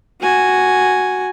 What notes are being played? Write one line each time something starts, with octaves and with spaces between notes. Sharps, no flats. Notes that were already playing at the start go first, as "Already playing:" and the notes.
F#4 G#5